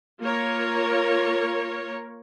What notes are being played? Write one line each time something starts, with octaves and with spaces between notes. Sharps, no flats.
A#3 F4 A#4 C#5